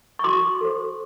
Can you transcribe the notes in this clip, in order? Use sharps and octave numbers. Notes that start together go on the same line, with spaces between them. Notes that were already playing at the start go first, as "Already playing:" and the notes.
C#6
F#4 C6 D6
A4 C5